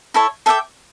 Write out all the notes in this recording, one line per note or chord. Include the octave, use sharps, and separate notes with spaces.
E4 A4 C#5
A4 E5 G5 D6